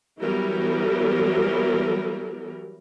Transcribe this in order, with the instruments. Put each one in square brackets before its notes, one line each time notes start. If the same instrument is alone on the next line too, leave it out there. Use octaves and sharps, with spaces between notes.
[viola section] E3 F#3 G3 B3 A#4